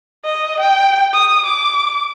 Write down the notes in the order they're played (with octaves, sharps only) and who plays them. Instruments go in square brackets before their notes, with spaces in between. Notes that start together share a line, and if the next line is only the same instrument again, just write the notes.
[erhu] D#5
G5
D#6
D6